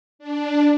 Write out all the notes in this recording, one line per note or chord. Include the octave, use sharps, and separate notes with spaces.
D4